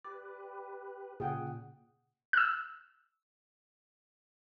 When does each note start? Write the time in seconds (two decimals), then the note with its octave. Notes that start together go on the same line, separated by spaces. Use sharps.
0.04 G4 B4 D5
1.20 A#2 C#3 G#4 F#5 G5
2.33 E6 F#6